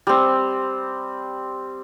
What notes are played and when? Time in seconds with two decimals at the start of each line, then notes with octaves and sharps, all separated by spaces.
0.07 G3 C4